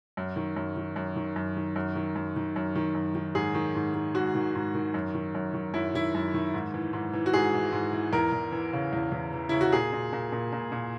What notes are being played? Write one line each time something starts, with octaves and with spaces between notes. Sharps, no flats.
F#2
D#3
F#2
D#3
F#2
D#3
F#2
D#3
F#2
D#3
F#2
D#3
F#2
D#3
F#2
D#3
G#2 G#4
D#3
G#2
D#3
G#2 F#4
D#3
G#2
D#3
F#2
D#3
F#2
D#3
F#2 E4
D#3 E4
F#2
D#3
G#2
E3
G#2
E3
F#4
G#2 G#4
E3
G#2
E3
E2 A#4
E2
E3
C#3
E2
E2
E3
C#3 E4
F#4
A#2 G#4
A#2
A#2
A#2
A#2
A#2